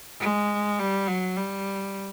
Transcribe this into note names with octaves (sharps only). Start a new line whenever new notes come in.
G#3
G3
F#3
G3